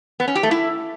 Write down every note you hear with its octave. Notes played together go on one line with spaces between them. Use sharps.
B3
C#4
G4
A3
E4